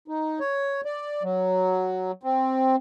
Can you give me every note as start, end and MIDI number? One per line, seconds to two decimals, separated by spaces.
0.08 0.39 63
0.40 0.81 73
0.85 1.23 74
1.23 2.12 54
2.23 2.76 60